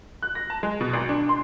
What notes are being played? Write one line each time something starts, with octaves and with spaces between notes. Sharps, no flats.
F#6
A#6
A5
G#3
B2
G#1
D4
C6